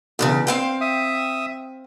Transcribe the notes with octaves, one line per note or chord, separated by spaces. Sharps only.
E2 G2 C#3
C4 F5 G5
E5 D#6